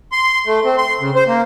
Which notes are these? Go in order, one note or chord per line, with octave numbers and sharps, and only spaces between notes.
C6
A3
C4
C6
C#3
C5
A#3